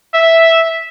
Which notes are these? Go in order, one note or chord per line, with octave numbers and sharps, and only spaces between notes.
E5